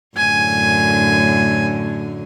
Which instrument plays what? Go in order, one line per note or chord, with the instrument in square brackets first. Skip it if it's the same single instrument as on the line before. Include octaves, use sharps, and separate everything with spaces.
[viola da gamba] F#2 A2 D3 [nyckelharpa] G#5